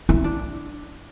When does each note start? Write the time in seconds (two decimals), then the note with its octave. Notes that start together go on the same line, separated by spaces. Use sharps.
0.09 E4
0.24 D4